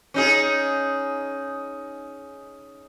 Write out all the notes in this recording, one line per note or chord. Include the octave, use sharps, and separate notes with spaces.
C#4 D#4 G#4